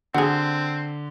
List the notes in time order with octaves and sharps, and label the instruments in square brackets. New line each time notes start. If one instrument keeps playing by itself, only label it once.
[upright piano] D3 [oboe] C4 [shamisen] F#4 G#4